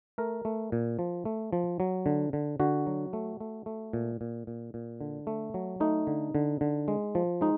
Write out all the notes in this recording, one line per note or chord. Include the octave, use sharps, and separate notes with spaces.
A3 A#4
A3
A#2
F3
A3
F3
F#3
D3
D3
D3 F#4
F#3
A3
A3
A3
A#2
A#2
A#2
A#2
D3
A3
F#3
A3 D#4
D3
D3
D3
G#3
F3
G#3 D#4